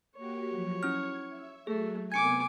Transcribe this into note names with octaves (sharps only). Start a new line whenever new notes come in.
A#3 F#4 G4 C#5
F3 F#3
C#4 E4 F6 G#6 C#7
E5
F#3 A3 G#4
C3 B3 G#5 D6 G#6 C#7